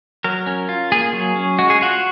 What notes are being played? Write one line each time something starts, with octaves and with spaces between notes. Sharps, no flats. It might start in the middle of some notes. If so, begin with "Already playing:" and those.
F#3 A#4
C#4
F4
A#3 G#4
F#3
C#4
G#3 F#4
G#4
F4 F#4